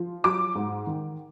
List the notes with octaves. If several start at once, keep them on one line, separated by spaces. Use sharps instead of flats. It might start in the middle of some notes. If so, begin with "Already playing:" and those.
Already playing: F3
F#3 D6
G#2
D#3